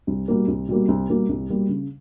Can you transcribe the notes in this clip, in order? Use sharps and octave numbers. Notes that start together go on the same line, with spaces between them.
C2
B2 G3 A#3
C2
B2 G3 A#3
C2
B2 G3 A#3
C2
B2 G3 A#3
C#3